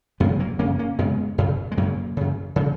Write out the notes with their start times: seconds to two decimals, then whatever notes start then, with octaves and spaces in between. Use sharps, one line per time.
0.20 F#2 G#3 B3
0.24 C#3
0.40 F#3 A#3
0.59 C#3 A#3 C#4
0.64 F#2
0.79 A#3 C#4
0.99 F#2 C#3 G#3 B3
1.38 F#2 C#3
1.72 G#3
1.77 F#2 C#3 F#3 A#3
2.17 F#2 C#3
2.56 C#3